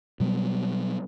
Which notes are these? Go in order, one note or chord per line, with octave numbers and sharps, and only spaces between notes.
B2 F#3 G3 B3